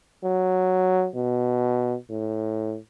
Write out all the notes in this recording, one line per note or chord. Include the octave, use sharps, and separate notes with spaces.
F#3
B2
A2